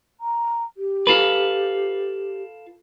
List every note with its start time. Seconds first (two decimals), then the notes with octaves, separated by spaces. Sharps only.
0.21 A#5
0.77 G4
1.07 F4 A4 B4